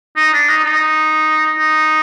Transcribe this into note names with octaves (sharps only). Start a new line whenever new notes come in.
D#4
D4
D#4
D#4
D#4